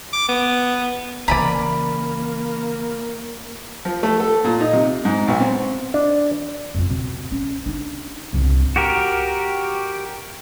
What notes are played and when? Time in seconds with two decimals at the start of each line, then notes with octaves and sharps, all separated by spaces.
0.13 D6
0.29 B3
1.28 C#3 E3 A#3 D5 G#5 A#5 B5
3.85 F3
4.03 A3
4.20 A4
4.44 A#2
4.61 D#4
4.73 C3
5.05 G#2
5.28 B1
5.40 C4
5.94 D4
6.75 F2 F4
6.89 B2 C4
7.32 C#4
7.66 D4 D#4
8.33 C2 G2
8.76 F#4 G4 A#4